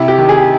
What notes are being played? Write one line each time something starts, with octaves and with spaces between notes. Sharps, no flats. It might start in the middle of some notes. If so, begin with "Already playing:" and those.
Already playing: C3 E4
G4
D#3
G#4